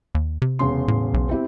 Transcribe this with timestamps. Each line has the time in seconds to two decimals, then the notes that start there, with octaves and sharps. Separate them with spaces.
0.15 D#2
0.42 C3
0.59 E1 C#3 C6
0.88 A2
1.14 B1
1.29 C4 E4 G4